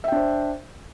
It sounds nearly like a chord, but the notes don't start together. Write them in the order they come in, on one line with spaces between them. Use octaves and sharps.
E5 G5 D4 C5